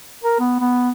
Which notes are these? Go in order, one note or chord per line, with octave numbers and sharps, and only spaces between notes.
A#4
B3
B3